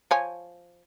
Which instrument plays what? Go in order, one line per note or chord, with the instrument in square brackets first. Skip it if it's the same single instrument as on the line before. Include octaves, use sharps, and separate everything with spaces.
[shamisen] F3 C#5 G#5